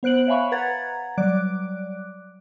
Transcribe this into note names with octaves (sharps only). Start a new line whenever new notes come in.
B3 C5 F#6 D7 F#7
C#5 E5 F5 G#5 B5 C#6
B4 F#5 A#5 G#6 A6
F#3 G3 D5 D6 F#6 D7